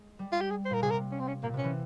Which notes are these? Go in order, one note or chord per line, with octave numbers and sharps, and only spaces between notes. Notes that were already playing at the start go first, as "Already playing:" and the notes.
Already playing: G#3
G3
F4
G4
G#4
C5
A#2 A#4
C3 G#4
A#4
C#4
C4
C#4
A#2 A#3
C3 C#4
E3